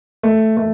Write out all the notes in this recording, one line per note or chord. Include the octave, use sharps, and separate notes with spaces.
A3
A3